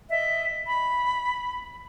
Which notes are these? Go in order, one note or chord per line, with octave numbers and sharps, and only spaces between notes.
D#5 E5
B5